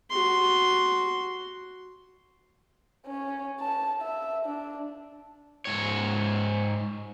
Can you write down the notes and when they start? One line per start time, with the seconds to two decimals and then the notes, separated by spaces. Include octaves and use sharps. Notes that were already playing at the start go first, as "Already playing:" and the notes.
0.10 F#4 C6
3.06 C#4
3.60 A5
4.01 E5
4.46 D4
5.65 G#2 C#5